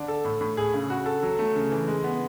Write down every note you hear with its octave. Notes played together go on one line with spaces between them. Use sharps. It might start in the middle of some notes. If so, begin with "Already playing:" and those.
Already playing: D3 D4
A4
A2
A2
G#4
C#3
F#4
A4
F#3
A3
C#3
E3
G#3
B3